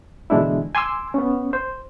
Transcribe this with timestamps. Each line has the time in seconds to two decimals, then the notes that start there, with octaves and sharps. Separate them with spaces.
0.30 B2 D3 E3 G#3 D4 E4
0.75 G#5 C6 D6 E6
1.14 B3 C#4
1.53 C5